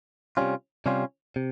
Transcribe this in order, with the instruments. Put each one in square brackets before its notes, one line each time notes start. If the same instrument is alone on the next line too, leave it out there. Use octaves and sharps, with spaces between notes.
[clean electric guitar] C3 G3 C#4 F4
C3 G3 C#4 F4
C3